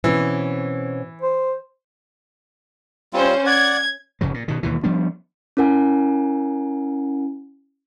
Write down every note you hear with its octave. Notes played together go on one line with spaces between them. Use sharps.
B2 E3 C4 C#4
C5
G3 C4 C#4 F4 C5
D5 F#5 G#6
F1 F#2 C#3 F#3
A#2
B2 D#3
D#2 B2 E3
F3 G3 B3 D4
C#4 E4 A#4 F#5 G#5